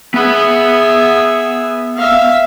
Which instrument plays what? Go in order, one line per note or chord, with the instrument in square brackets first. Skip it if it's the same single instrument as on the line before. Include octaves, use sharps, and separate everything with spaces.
[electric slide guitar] B3 F#5 [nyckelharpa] G#4 E5
[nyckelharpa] E5 F5